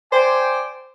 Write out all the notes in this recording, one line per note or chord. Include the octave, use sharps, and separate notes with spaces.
C5 D5 G5 G#5